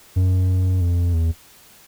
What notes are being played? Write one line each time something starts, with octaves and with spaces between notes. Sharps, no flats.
F#2
F2
E2